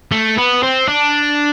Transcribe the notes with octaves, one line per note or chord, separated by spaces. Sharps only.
A3
B3
C4
D4